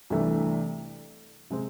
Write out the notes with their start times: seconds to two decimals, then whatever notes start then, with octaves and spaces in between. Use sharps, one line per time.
0.10 C2 C3 E3 A3 D4
1.50 C3 G#3 C4